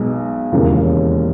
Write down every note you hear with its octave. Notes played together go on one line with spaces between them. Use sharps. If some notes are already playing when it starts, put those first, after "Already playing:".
Already playing: B1 B2 G#3
E1 D#2 C#3 E3 A#3